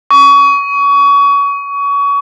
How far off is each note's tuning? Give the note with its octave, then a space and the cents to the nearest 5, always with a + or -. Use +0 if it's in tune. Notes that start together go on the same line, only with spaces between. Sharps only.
C#6 +30